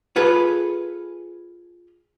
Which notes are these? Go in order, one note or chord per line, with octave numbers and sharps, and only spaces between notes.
F4 G#4 A4 B4